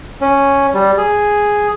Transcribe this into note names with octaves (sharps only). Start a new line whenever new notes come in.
C#4
G3
G#4